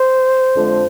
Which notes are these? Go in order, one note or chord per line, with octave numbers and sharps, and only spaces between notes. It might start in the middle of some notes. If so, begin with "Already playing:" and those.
Already playing: C5
F2 D3 F3 G#3